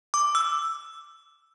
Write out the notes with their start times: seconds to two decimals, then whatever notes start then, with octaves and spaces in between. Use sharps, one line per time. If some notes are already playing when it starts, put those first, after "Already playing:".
0.14 D6
0.35 E6